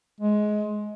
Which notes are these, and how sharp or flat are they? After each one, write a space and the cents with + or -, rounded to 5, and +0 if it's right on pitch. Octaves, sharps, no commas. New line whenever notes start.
G#3 +20